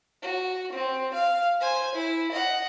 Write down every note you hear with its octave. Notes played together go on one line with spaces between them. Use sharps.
F#4
C4
F5
C5 G#5
E4
D#5 F#5